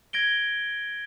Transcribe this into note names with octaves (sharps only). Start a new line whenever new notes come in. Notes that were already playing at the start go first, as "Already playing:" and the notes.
G#6 A#6 D7 G7